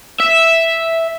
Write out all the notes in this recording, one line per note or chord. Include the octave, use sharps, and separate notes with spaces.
E5